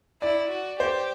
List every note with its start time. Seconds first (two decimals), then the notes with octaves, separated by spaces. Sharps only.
0.22 E4 D5
0.50 F#4
0.80 G4 C5